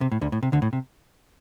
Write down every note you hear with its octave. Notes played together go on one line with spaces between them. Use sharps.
C3
A2
D2 D3
A2
C3
D2 D3
A2
C3